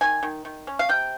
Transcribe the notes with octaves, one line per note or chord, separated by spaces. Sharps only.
D#3 G#5
D#3
D#3
C#4
F5
C3 G5